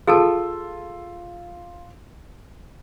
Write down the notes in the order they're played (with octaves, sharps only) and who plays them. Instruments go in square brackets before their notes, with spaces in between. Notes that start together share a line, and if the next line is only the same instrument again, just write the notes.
[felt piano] F4 E6 [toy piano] G#4 A4 A5